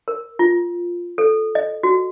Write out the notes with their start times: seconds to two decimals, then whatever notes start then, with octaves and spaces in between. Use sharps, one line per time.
0.08 A#4
0.39 F4
1.18 A4
1.55 D#5
1.83 F#4